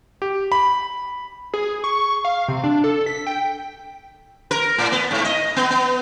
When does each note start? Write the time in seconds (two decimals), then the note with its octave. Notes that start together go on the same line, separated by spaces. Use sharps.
0.22 G4
0.52 B5
1.54 G#4
1.84 C#6
2.25 F5
2.48 C3
2.64 D4
2.84 A4
3.06 B6
3.27 G5
4.51 A#4
4.78 A2
4.92 B3
5.11 G#2
5.25 D#5
5.56 B3
5.70 B3